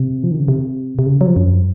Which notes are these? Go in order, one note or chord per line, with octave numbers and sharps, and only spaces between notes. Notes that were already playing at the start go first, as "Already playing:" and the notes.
Already playing: C3
F3
D#3
C#3
C3
C3
C#3
F#3
F3
F#2